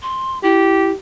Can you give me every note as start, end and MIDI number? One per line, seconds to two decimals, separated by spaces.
0.02 0.39 84
0.43 0.92 64
0.43 0.94 67